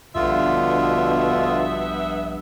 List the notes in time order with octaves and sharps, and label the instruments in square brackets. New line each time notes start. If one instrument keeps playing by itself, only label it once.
[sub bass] A#1 [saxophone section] G2 B3 E5 [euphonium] B2 [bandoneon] D3 F4